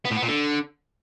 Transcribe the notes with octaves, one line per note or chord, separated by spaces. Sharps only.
B3
A2
B3
A#2
D3